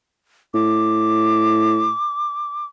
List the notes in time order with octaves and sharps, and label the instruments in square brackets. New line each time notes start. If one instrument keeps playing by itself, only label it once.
[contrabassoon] A2 [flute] D6